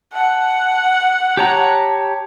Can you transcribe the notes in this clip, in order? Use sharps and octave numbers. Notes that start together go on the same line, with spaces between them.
F#5 A5
G4 C#5 A5 A#5